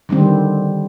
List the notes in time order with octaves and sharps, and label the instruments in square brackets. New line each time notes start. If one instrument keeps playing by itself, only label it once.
[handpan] D3 D#3 G3 C4